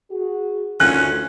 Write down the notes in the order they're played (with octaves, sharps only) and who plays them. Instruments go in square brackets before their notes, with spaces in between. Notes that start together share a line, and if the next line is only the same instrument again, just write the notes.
[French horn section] F#4 G#4
[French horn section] D2 [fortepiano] D#3 A3 F4 [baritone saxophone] C#4 [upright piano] F#6